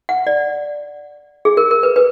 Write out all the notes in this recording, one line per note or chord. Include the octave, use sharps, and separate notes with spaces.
F#5
D5
G#4
A#4
A#4
B4
B4